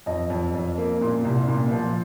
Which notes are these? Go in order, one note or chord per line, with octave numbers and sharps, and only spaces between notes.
F2 D#5
F2
F2
A#3
A#2
C2
A#2
F3